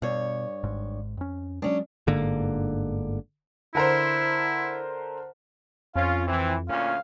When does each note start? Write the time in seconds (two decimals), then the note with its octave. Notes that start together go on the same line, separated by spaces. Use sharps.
0.02 G2 B2 C#5
0.64 G#1 G#2
1.17 F2 C#4
1.62 F#3 G#3 C#4 D4
2.07 G1 G#2 D3 A#3
3.75 D3 E4 A#4 C5
5.96 F2 C#4 F4 F5
6.27 E3 C4
6.69 D2 A#2 C#4 F5